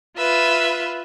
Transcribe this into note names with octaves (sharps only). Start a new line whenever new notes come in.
F4 B4 E5